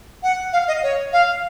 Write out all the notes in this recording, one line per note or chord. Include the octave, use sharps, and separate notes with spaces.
F#5
F5
D#5
C#5
F5